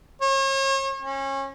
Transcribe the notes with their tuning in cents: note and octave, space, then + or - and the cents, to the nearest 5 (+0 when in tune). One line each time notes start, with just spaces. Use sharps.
C#5 -40
C#4 -30